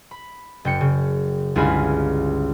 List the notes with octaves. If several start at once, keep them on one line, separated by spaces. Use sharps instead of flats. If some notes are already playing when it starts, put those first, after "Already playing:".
B5
F#1 G5 C#7
C#3
G1 C#2 E4 F5 G#5 B5